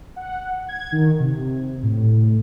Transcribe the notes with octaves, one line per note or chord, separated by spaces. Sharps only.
F#5
G#6
D#3
C3
A2